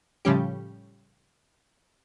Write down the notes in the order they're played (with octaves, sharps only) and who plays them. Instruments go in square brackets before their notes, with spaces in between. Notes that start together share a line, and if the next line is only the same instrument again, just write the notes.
[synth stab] A2 C#3 F3 G3 C#4 G4